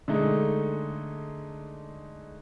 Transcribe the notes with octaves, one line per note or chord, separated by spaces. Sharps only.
D3 G#3 A3 D#4